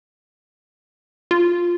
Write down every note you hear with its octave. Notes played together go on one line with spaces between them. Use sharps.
F4